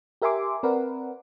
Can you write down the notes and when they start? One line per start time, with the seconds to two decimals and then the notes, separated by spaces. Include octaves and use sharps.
0.22 G4 A#4 E5 G#5 C6 D6
0.63 C4 A#4 B4 D5 F#5